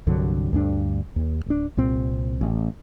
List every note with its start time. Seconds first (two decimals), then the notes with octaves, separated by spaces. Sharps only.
0.07 C2 G2 D3 F#3
0.53 D2 G2 D4
1.16 D#2
1.46 D1 D4
1.77 C2 A#2 C4
2.41 A1